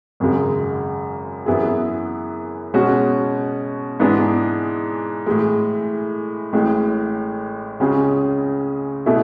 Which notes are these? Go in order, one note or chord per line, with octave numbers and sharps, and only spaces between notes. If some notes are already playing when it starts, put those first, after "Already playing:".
G#1 F#2 C#3 G#3
F#2 E3 B3 E4 G#4
B2 G#3 C#4 F#4
G#2 E3 B3 D4 G#4
A2 E3 G#3
A1 A2 G#3
C#2 C#3 G#3 C#4 G#4
B2 A3 E4 G#4